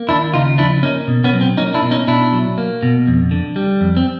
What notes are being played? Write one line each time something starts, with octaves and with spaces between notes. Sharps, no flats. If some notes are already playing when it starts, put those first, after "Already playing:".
Already playing: A#3
D#2 D4 E4
C#3 D#4 F4
F3 D4 E4
A#3 C#4 D#4
B2
B3 C#4
F#3
C4
A#3 C#4 D#4
D4 E4
B2
C#4 D#4
B2 D4 E4
F#3
A#3
B2
F2
D3
G3
F2
C4